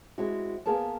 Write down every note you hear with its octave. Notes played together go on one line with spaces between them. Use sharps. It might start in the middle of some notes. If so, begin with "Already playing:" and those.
G#3 C4 E4 F#4
A#3 B3 G#4 A#4 A5